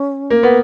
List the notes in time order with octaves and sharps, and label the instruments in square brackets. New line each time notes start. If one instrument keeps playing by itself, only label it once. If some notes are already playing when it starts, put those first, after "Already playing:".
Already playing: [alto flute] C#4
[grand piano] A#3
B3